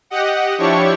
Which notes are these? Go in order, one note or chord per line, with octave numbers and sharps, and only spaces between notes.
G4 D#5 F#5
F3 D4 E4 G4 C#5 C#6